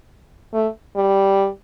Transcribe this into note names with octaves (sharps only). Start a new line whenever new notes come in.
A3
G3